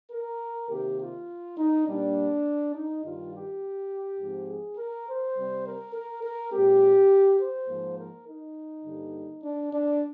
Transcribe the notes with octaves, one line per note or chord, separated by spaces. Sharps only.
A#4
C3 D#3 A#3 G4
F4
D#4
A#2 G3 A#3 D4
D#4
G2 D#3 G3 F4
G4
G#2 F3 C4
G#4
A#4
C5
C3 G3 C4
A#4
A#4
A#4
A#2 G#3 C4 G4
C5
G#2 F3 A#3
A#4
D#4
G2 D3 G3 A#3
D4
D4